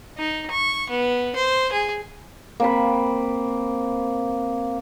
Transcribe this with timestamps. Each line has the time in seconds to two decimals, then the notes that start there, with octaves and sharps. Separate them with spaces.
0.17 D#4
0.51 C#6
0.90 B3
1.36 C5
1.72 G#4
2.60 A#3 C4 B5